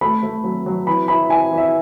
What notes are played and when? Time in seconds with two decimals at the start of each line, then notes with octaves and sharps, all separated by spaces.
0.01 A3 B5
0.23 A3
0.44 F#3
0.66 F#3
0.87 E3 B5
1.08 E4 B5
1.29 E4 G#5
1.52 E3
1.58 E5